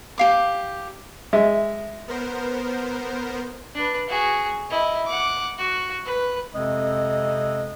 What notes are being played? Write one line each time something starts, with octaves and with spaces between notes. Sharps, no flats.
G4 F5 D6
G#3 E5
B3 A#4 C5
D4 B4
F#4 G#4
E4 D#5
F#5 D6
F#4
B4
F2 C3 G#3 C4 D#5